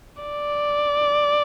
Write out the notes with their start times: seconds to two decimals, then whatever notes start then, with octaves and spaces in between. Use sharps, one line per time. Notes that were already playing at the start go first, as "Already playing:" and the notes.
0.23 D5